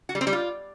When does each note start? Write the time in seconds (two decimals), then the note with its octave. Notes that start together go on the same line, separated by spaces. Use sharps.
0.09 F#4
0.15 G3
0.21 C4
0.27 G3
0.33 F4